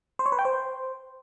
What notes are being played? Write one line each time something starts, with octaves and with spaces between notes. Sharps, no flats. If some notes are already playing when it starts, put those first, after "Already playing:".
C5
C#5
B4
G5
C5